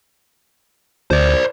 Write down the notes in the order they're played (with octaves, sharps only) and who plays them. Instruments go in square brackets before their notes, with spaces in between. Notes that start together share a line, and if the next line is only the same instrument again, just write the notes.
[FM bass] D2 [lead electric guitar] C5 D5